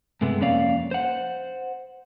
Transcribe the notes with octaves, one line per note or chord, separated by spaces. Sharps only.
G2 C3 G#3 A3 B3
F2 A#3 C#4 C#5 D5 F5
C5 F#5